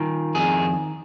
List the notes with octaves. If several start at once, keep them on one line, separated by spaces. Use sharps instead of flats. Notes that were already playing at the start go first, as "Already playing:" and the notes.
Already playing: D#3 F4
F2 G#4